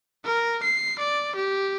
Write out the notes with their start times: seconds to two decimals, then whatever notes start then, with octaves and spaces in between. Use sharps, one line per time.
0.25 A#4
0.63 C7
0.99 D5
1.36 G4